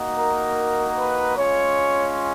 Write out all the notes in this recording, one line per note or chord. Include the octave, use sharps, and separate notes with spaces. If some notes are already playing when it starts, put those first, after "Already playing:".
Already playing: A#3 D#4 F#4
A#4
B4
G#3 C#4 F4 C#5